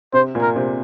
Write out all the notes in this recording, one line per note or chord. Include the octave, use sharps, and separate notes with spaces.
C3 C4 C5
A#2 A#3
A#4
C3 C4